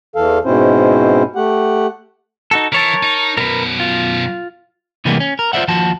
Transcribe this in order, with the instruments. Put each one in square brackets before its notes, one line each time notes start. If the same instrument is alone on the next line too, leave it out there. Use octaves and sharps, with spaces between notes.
[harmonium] E2 E3 A4 F5
G#2 B2 C4 C#4 E4 C5
A3 G4 F#5
[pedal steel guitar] D#4 F#4 A4
[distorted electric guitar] E3 [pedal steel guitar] A#4 C#5 A5
[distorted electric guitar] D#4
[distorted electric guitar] F#2 B2 [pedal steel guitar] A#4 B4
[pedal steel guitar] F4
[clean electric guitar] C3 E3 G3 G#3 A#3 B3
C#4
A#4
F4 C5 D5 E5 F#5
D#2 F3 F#4 A5